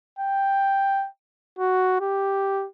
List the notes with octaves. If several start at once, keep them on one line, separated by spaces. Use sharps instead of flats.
G5
F#4
G4